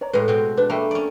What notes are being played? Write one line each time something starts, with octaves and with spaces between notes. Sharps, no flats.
C#5 D5 A#5
A2 G#3 B4
B2 C4
D4 B4
A3 A#3 E5 G5 B5
C#4 D5